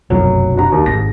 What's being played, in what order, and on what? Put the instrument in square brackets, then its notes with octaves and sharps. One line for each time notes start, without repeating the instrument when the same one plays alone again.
[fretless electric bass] F1 B1 F#2 [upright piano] F#3
[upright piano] D4 F#4 A#5
D#2
[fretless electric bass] G#1 G#2 [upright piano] A#6